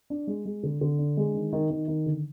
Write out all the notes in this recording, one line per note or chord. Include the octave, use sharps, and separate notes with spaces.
D4
G#3
G#3
D3
D3
D4
G#3
D#3
D#3
D#3
D#3
D3